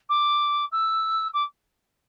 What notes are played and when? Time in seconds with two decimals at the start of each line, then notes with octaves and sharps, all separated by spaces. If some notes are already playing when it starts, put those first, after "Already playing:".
0.09 D6
0.71 E6
1.33 D6